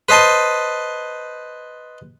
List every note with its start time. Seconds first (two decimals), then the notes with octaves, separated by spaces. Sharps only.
0.09 B4 C5 D#5 A5 C6